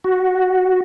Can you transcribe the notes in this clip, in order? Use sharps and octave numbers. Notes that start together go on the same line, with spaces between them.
F#4